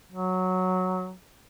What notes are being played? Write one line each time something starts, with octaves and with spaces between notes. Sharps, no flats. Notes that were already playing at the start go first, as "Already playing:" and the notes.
F#3